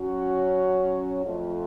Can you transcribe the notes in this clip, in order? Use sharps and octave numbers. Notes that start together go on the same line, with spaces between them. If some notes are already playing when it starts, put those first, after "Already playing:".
Already playing: F#3 C#4 F#4
F2 F3 A3